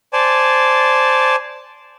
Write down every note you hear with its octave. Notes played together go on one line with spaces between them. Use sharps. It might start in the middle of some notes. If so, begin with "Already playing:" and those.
C5 D5 G#5 A5